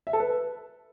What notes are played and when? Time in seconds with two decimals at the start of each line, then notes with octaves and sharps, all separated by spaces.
0.07 E5
0.13 A4
0.20 B4